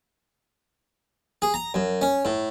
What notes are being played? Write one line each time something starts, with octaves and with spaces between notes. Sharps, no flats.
G#4
A#5
F#2
C#4
A2